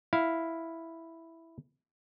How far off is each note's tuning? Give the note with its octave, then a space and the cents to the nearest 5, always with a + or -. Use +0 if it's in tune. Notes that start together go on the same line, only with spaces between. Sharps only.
E4 +0 F5 +0